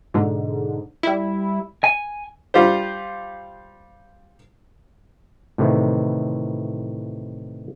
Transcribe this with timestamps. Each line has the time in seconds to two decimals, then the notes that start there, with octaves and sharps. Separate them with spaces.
0.14 G#2 B2 D3
1.03 G3 E4
1.84 G#5
2.54 G3 F4 G4 C5
5.58 A2 C3 D#3 E3